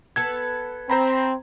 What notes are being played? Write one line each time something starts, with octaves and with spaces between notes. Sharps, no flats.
B3 A4 B4 G#6
C4 C5 A#5 B5